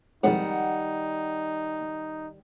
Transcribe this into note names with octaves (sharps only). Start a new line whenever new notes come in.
C2 F2 G#2 D#3 G3 D#4 F#5